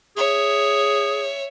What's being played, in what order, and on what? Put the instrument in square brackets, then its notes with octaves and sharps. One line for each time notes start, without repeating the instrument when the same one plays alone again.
[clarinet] G#4 [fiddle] C#5 E5